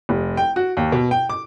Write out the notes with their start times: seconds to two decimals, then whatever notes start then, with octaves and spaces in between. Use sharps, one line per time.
0.09 F1
0.37 G5
0.56 F#4
0.77 D#2
0.92 B2
1.11 G5
1.29 D6